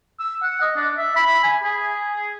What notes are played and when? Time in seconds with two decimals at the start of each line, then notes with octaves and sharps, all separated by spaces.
0.20 E6
0.42 F#5
0.61 D#5
0.76 D4
0.98 E5
1.16 B5
1.43 G#5
1.64 G#4